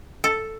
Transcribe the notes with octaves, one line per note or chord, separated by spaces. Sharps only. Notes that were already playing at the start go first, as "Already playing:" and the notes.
A4